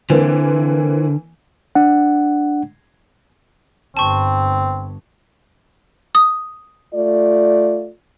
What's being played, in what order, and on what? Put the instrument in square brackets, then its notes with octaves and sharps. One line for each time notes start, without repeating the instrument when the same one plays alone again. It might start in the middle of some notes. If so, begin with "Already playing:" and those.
[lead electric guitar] D3 [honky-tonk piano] E3 A#3 C4
[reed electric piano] D4 F#5
[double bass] G1 G2 [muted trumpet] C4 [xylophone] A5 C#6
[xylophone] D#6
[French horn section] A3 F4 D5